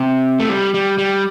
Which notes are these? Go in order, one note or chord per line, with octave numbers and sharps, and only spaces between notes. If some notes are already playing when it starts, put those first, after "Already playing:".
Already playing: C3
A3
G3
G3
G3